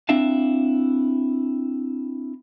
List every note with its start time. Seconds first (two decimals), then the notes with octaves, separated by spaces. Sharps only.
0.09 C4 D4 E4 E5 F5 A5